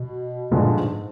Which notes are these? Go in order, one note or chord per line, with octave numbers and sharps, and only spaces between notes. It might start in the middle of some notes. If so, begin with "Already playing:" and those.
Already playing: B2
G2 A#2 D3 F3 G#3
G#2